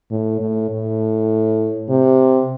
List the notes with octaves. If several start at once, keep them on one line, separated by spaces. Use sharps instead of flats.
A2
A2
A2
C3